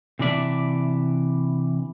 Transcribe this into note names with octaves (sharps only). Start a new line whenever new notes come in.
C3 E3 D4 D5 E5